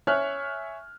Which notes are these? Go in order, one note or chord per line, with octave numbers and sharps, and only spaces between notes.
C#5 E5 G#5 C#6 F6 F#6